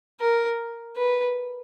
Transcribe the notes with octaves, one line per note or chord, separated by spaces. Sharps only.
A#4
B4